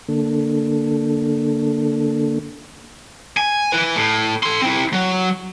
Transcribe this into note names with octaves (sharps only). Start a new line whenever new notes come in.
D3 A#3 D4 A4
G#5
E3 B4
A2
A4 C6
C4 E4
F#3